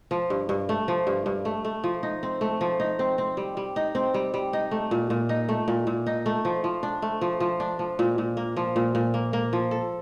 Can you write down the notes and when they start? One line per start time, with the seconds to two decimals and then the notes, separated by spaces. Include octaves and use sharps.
0.11 F3
0.30 G2
0.49 G2
0.69 A3
0.88 F3
1.07 G2
1.26 G2
1.45 A3
1.65 A3
1.84 F3
2.03 D#4
2.23 C4
2.41 A3
2.61 F3
2.80 D#4
2.99 C4
3.18 C4
3.37 G3
3.57 G3
3.76 D#4
3.95 C4
4.14 G3
4.34 G3
4.53 D#4
4.71 A3
4.91 A#2
5.10 A#2
5.29 D#4
5.49 A3
5.68 A#2
5.87 A#2
6.07 D#4
6.26 A3
6.45 F3
6.64 F3
6.83 D4
7.02 A3
7.21 F3
7.40 F3
7.60 D4
7.79 F3
7.99 A#2
8.18 A#2
8.37 A#3
8.57 F3
8.76 A#2
8.95 A#2
9.14 A#3
9.33 A#3
9.53 F3
9.71 A4